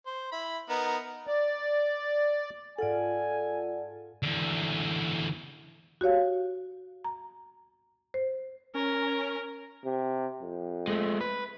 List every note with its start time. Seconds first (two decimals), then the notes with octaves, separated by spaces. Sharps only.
0.06 C5
0.32 E4 B5
0.70 B3 D#4 A#4
1.27 D5
2.78 G#2 F4 A4 D5 F#5 G#5
4.23 E2 D3
6.01 F#4 G4 C#5 F5
7.04 A#5
8.14 C5
8.75 C#4 A#4
9.85 C3
10.42 F2
10.88 G#3 A3
11.21 B4